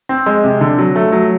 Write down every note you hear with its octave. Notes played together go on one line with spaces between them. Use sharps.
C4
G#3
C3
D3
F#3
A3
F#3